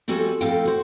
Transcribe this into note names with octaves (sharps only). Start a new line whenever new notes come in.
F2 G3 C4 F#4 A4 G#5
F2 A2 C4 A4 F5 G5
F#4 C5